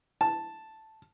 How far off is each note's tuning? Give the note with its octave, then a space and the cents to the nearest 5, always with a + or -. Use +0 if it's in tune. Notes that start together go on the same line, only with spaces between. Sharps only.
A5 +0